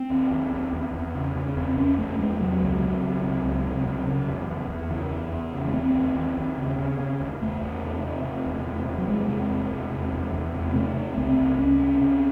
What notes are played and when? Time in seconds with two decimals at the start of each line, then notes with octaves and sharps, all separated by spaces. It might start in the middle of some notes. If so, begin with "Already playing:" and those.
Already playing: C4
0.10 D#2
0.31 D#2
0.53 D#2
0.73 E2
0.94 E2
1.15 C#3
1.36 C#3
1.57 E2 C4
1.77 E2 C#4
1.98 E2 A3
2.19 E2 G#3
2.40 C3 F#3
2.62 C#2
2.82 C3
3.03 C#2
3.23 C3
3.44 C#2
3.66 C3
3.87 C3
4.06 C#3
4.28 E2
4.49 E2
4.70 E2
4.90 C#3 E3
5.11 E2
5.32 E2
5.54 C#3
5.67 A3
5.74 D#2 C4
5.95 D#2
6.15 D#2
6.37 D#2
6.58 C#3
6.79 C#3
7.00 C#3
7.20 D#2
7.41 E2 A3
7.61 E2
7.82 C3
8.03 C3
8.24 C3
8.46 E2
8.67 C3
8.88 C3
8.98 F#3
9.08 E2 G#3
9.29 C3
9.50 E2
9.70 E2
9.91 C3
10.13 E2
10.33 E2
10.55 C3
10.69 C4
10.75 C3 A3
10.97 C3
11.17 C#2 C4
11.37 C#2
11.59 C#2 C#4
11.80 C3
12.01 C3